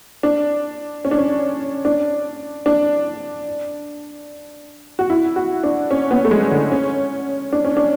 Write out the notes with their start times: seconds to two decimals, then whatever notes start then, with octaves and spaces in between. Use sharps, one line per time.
0.23 D4
1.05 C#4
1.11 D4
1.18 C#4
1.85 D4
2.66 D4
4.99 F#4
5.10 E4
5.36 F#4
5.64 D4
5.91 C#4
6.11 B3
6.25 A3
6.31 G#3
6.51 D3
6.72 C#4
7.53 D4
7.65 C#4
7.77 D4